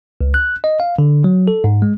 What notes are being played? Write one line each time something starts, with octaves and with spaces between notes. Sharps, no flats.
C#2
F#6
D#5
F5
D3
F#3
A4
G#2
G#3